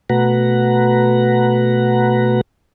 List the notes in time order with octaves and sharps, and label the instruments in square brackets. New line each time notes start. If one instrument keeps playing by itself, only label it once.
[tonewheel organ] B2 A3 F#4 B4 F#5 A#5